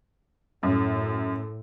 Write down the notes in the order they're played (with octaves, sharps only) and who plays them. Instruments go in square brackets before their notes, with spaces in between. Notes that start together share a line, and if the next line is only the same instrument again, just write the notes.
[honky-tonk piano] F#2 [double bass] A2